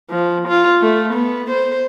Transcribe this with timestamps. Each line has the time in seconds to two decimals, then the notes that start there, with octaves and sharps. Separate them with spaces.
0.10 F3
0.48 F4
0.82 A3
1.13 B3
1.50 C5